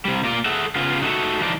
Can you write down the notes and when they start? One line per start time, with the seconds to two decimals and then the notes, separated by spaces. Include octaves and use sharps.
0.05 C3 G3
0.24 A#3 F4 D5
0.46 G#4 A4 E5 F#5
0.76 C#3 B3 F4 G#4
1.01 D#4 F#4 A4 E5
1.41 E3 F3 D4 D#4 F4 D5